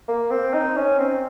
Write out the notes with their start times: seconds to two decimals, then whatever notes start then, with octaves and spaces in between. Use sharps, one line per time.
0.08 A#3
0.31 C4
0.54 D#4
0.76 C#4
0.99 C4